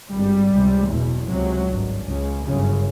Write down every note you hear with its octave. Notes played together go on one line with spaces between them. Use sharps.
G#1 G2 G3
C#2 C3
F#1 E2 B2
C#2 C3 F#3
G#1 G2
C#2 C#3
G1 F#2 C#3